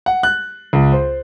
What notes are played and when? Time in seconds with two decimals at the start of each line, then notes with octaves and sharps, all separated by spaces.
0.06 F#5
0.23 F#6
0.73 C#2
0.92 C5